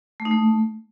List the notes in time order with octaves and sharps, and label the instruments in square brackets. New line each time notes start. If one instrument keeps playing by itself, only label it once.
[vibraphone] A3
D#4
A3